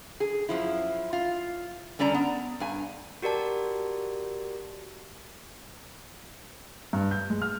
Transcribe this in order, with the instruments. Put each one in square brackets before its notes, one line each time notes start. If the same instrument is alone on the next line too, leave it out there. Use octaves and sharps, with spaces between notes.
[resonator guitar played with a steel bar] G#4
F#2 F3 E4
F4
D3 G3 C#4 D5 A#5
B3
G2 G#5
[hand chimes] F#4 G4 A#4 D5 A5
[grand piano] G2
G6
G#3
F6